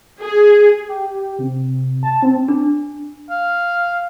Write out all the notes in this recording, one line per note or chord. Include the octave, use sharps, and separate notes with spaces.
G#4
G4
C3
A5
C4
D4
F5